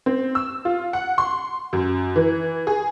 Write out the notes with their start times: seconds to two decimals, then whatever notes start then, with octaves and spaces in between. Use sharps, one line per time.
0.06 C4
0.35 E6
0.65 F4
0.93 F#5
1.18 C6
1.73 F#2
2.16 E3
2.67 G#4